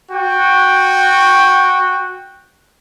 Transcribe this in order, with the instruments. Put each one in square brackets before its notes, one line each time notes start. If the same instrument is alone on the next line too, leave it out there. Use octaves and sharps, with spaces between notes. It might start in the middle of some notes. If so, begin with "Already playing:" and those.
[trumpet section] F#4 G5